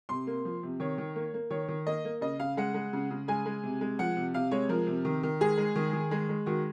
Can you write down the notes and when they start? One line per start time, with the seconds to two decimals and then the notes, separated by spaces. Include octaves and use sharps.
0.09 C3 C6
0.27 A#3
0.45 F3
0.63 C3
0.80 D#3 C#5
0.98 D#3
1.16 A#3
1.34 A#3
1.51 D#3 C#5
1.68 D#3
1.87 A#3 D#5
2.05 A#3
2.21 C#3 D#5
2.39 C#3 F5
2.57 G#3 F#5
2.74 G#3
2.93 C#3
3.11 C#3
3.28 G#3 G#5
3.46 G#3
3.63 C3
3.81 G#3
3.99 F3 F#5
4.17 C3
4.34 C3 F5
4.51 G#3 C#5
4.69 F3 A#4
4.87 C3
5.05 D#3
5.23 D#3
5.41 G#3 G#4
5.58 G#3
5.76 D#3
5.93 D#3
6.11 G#3
6.29 G#3
6.46 D#3 F#4